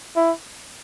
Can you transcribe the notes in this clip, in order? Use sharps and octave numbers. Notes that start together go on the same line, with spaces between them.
E4